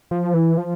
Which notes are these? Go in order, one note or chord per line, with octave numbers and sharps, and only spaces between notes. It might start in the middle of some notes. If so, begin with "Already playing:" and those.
F3
E3
F3